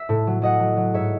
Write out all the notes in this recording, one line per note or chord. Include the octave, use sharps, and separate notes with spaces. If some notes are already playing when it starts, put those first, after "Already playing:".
Already playing: E5
A2
F#3
F#3 D#5 F#5
F#3
F#3
G#2 C#5 E5